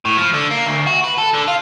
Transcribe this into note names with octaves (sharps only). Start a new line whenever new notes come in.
A2
F3
D3
A#3
D2
F#4
B4
A4
D3
F4